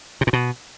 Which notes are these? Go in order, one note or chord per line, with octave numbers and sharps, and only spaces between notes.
C3
A#2
B2